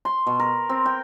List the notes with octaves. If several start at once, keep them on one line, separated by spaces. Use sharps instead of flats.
C6
B2
A#4
C4
G5